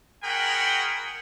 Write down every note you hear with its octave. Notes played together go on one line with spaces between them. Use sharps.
F#4 G#4 A#4 F#5 G5 B5